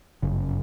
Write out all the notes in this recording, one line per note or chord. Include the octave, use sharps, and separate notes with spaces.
G1 F#2 C#3